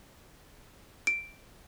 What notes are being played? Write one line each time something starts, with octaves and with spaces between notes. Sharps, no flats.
D7